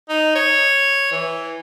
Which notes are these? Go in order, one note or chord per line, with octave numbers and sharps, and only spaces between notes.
D#4
C#5
E3